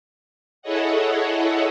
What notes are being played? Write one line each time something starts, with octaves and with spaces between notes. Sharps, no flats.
E4 G#4 A4 C#5 D#5 F#5